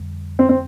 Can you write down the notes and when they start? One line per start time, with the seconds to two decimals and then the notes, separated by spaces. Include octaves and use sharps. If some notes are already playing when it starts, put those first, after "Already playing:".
Already playing: F2 D3 G3
0.39 C4
0.49 C4